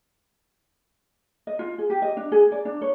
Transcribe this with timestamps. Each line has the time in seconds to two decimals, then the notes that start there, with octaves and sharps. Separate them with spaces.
1.47 D#5
1.59 F4
1.78 G#4
1.90 G4
2.02 D#5
2.17 D4
2.32 G#4
2.52 D5
2.65 D4
2.82 C#5